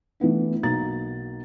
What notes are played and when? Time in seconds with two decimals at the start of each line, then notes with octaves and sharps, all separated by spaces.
0.20 E3 A3 B3 D4
0.63 B1 A#3 F#4 A#5 A6